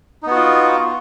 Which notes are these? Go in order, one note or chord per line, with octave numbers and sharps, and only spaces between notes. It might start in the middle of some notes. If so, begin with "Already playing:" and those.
B3 D#4 F4 F#4